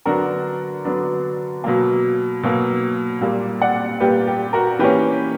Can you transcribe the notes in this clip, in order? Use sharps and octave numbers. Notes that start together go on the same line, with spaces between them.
D3 F#3 B3 D4 F#4 A#4
D3 F#3 B3 D4
B2 F#3 A#3
B2 F#3 A#3
A#2 G3 A#3
D5 F#5
A#2 G3 A#3 G4 B4
G4
F#4 A#4
E3 A#3 C#4 G4 B4